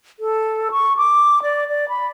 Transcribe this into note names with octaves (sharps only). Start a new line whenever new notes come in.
A4
C#6
D6
D5
D5
B5